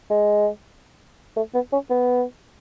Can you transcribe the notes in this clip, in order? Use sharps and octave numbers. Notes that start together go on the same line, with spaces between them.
G#3
A3
B3
C#4
B3